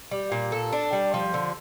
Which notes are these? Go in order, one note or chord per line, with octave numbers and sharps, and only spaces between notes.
G3
A#2
A4
D4
G3
F3
D3